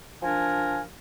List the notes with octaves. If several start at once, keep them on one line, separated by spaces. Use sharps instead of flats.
F3 D4 A#4 G#5